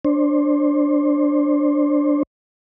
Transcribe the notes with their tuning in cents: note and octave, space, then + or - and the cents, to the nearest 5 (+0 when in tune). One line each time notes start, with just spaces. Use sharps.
D4 +0 C5 +25